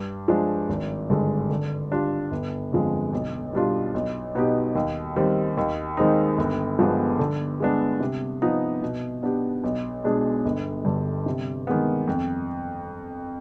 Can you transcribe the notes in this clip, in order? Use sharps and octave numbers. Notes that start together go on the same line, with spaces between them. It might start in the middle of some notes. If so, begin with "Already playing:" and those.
Already playing: G2
F3 G#3 D4
G#1
G2 D3 G#3
D3
G3 D4 F4
G1
F2 D3 F3 G#3
B1
B2 G3 D4 F4
B1
B2 B3 D#4 G4
D#2
D#3 G3 C4
D#2
D#3 G#3 C4 D#4
G1
G2 F3 G#3 B3
D3
G#3 B3 D4
C3
F3 B3 D#4
B2
B3 D4 G4
B1
B2 G#3 D4 G#4
G1
G2 D3
C3
D#3 G#3 B3
F2